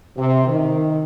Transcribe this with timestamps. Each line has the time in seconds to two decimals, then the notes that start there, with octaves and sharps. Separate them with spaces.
0.18 C3
0.47 D#3